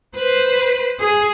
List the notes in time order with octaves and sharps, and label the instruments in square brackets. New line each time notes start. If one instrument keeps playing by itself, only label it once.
[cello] B4 C5
G#4